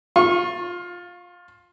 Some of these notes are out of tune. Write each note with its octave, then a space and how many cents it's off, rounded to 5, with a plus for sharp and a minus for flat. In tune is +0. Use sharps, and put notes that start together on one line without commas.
F4 +15 C#6 -30